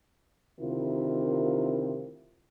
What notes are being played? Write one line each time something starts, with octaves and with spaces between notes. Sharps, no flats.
D2 C3 D#3 E4 F4 A#4